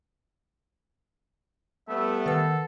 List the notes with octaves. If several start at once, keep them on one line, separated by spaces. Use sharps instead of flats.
G3 A3 B3 E5
D#3 A4 B4 F#5